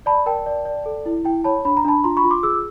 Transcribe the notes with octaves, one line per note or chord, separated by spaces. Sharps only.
D5 A5 B5
A#4 G5 A5
D5
D5
A4
E4
E4 G5
C#5 A5 B5
D4 B5
A#5
D4 A5 B5
F4 A#5 C6
B5 C#6
F4
C6 D6
G#4 D6 E6